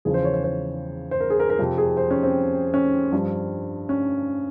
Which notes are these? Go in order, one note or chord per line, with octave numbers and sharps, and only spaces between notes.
E2 C#3 F3 G#4
C5
C#5
C5
C5
C5
A#4
G#4
A#4
A#4
F2 C3 F3
G#4
C5
C#4
C4
C#4
G2 F3
C#4